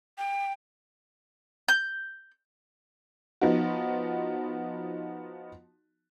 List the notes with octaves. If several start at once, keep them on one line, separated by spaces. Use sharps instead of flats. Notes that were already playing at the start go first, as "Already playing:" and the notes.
G5
G6
F3 B3 D#4 F#4